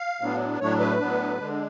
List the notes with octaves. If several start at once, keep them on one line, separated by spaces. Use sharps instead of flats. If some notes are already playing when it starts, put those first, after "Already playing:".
Already playing: F5
A2 F#3 B3 D4
A2 F#3 A3 D4 C#5
B4
A2 F#3 B3 D4
D3 G#3 D4